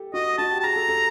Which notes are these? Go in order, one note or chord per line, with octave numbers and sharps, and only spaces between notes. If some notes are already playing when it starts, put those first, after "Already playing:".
Already playing: G4 A4
F#4 D#5
F#4 A5
G4
A5
G#4 A#5
A4
A4